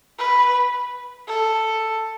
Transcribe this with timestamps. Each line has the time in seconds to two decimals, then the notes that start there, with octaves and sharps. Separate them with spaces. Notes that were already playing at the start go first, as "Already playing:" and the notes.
0.19 B4
1.28 A4